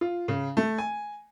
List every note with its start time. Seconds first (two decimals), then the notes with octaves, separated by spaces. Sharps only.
0.01 F4
0.28 C#3
0.57 A3
0.78 G#5